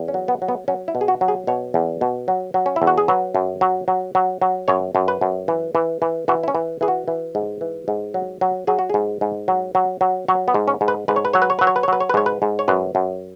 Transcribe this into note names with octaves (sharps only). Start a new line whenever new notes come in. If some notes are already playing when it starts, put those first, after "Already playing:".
Already playing: E2
C#4
F#3
B3
F#3
B3
F#3 C#4
E4
B2
G#4
F#4
F#3
G#4
B2 C#5
E2
B2
F#3
F#3
C#4
E4
E2
F#4
G#4
F#3 B4
F#2
F#3
F#3
F#3
F#3
F#2 C#5
F#2
B4
F#2
E3
E3
E3
E3 F#4
E4
C#4
E3
E3 G#4
F#4
E3
G#2
E3
G#2
F#3
F#3
F#3 G#4
F#4
G#2 G#4
G#2
F#3
F#3
F#3
F#3 C#5
B3
G#2
C#4
G#2
B4
G#2 B4
C#5
B4
F#3 C#5
B4
C#5
F#3 B4
C#5
B4
C#5
F#3 B4
C#5
B4
G#2 C#5
B4
G#2
C#5
F#2 B4
F#2